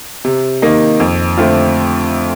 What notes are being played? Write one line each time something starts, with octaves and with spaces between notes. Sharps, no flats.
C3
D#3 A#3 D#4
F2
D3 A3 C4 F4